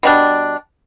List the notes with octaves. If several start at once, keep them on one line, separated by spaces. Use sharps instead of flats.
B2 G3 D4